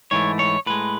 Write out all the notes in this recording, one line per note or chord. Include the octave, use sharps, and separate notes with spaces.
G#2 E3 A3 C#5
C#5
A2 G#3 B4